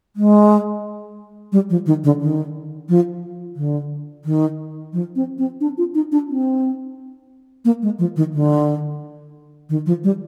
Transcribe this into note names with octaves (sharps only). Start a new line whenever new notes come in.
G#3
G3
F3
D#3
D3
D#3
F3
D3
D#3
F3
C4
C4
D4
F4
D#4
D4
C4
A#3
G#3
F3
D#3
D3
D#3
F3
G3